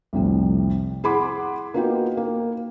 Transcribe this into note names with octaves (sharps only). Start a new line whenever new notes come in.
C2 F2 A2 C3
E4 G#4 F#5 B5 C6 D6
A#3 B3 D#4 F4 F#4 G5
A#3